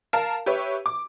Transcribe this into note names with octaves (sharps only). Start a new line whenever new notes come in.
A#4 F5 A5
G4 B4 C#5 E5
D6